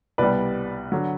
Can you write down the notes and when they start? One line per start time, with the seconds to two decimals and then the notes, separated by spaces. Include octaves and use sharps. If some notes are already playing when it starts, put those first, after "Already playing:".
0.18 C2 B2 G3 B4 D5
0.92 D3 F#3